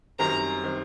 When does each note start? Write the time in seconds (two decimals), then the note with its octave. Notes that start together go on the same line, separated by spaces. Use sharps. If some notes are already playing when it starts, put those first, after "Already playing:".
0.19 F#2 D#3 G3 C4 A#5
0.63 D#3 G3 C4